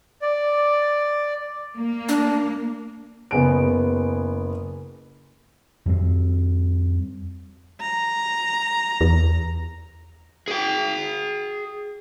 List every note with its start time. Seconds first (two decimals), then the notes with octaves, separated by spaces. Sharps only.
0.22 D5
1.76 A#3
2.09 D4
3.31 F#1 B3 G#4 D7
5.86 F2 G3 C4
7.81 A#5
9.01 E2
10.48 G#4 G5